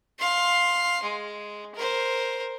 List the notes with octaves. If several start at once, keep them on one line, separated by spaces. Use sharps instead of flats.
F5 C6
G#3
A#4 C5